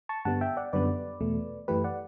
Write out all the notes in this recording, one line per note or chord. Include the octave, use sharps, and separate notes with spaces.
A5 C#6
G2 D3 G3 B3 F#5 A5
E5 G5
D5 F#5
F#2 D3 G3 B3 B4 D5
E2 B2 A3
F#2 E3 A3 G4 B4
D5 F#5